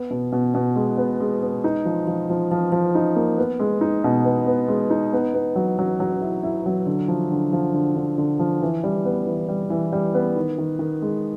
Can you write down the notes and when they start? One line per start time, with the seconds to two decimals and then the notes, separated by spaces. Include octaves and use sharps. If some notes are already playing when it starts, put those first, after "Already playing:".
Already playing: B3
0.10 B2
0.32 B2
0.54 B2
0.76 G#3
0.98 B3
1.20 G#3
1.42 B3
1.64 D#4
1.85 F3
2.07 F3
2.30 F3
2.51 F3
2.72 F3
2.95 D#4
3.16 A#3
3.38 B3
3.59 G#3
3.81 D#4
4.04 B2
4.25 B3
4.47 B3
4.68 G#3
4.90 D#4
5.13 B3
5.34 B3
5.56 F#3
5.79 F#3
6.00 F#3
6.22 E4
6.43 E4
6.66 F#3
6.86 D3
7.08 F3
7.31 D3
7.53 F3
7.74 D3
7.96 D3
8.18 D3
8.39 F3
8.62 E3
8.84 G3
9.05 B3
9.27 E3
9.48 G3
9.70 E3
9.93 G3
10.14 B3
10.36 D#3
10.58 D#3
10.79 D#3
11.02 G#3